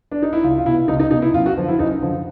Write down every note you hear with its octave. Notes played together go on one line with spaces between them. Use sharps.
D4
D#4
E4
C#2 F4
F4
B2 E4
C#2 D#4
D#4
B2 D#4
E4
F#2 F4
F#4
D3 F3 F4
E4
F#2 D#4
D3 F3